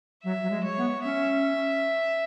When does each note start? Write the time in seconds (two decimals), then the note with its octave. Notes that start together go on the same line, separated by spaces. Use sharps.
0.24 F#3 E5
0.42 F#3
0.50 G#3
0.64 C#5
0.77 B3
1.03 C#4 E5